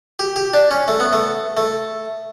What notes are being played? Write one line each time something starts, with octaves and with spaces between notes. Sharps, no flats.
G4
G4
D4
C#4
A3
B3
A3
A3